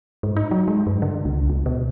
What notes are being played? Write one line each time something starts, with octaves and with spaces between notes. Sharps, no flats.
G#2
D#4
F#3
G#3
G2
D3
C#2
C#2
B2